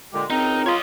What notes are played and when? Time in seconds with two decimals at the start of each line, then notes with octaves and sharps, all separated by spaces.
0.14 A#2 D3 G#3 G4
0.30 C#2 C4 D#4 A#4
0.66 F4 C#5 D#5